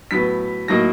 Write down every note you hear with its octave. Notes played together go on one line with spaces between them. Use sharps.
A2 F#3 B3 B6
A2 F#3 A#3 D#4 A#6